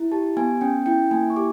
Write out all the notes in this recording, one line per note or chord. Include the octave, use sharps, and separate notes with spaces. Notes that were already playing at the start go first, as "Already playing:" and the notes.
Already playing: E4
G4 A5
B3 G#5
C#4 G5
E4 G5
A#3 G#5
C#6
G4 D6